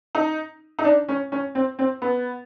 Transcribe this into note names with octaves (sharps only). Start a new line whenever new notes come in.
D#4
D#4
D4
C#4
C#4
C4
C4
B3